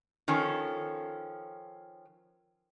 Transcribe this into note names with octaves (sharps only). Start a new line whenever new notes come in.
D#3 F3 C#4 A4